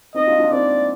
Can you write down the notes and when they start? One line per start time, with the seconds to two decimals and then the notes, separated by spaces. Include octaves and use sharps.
0.15 C4 D#4 D#5
0.27 D4 F4
0.39 D4 F4
0.51 C4 D#4 D5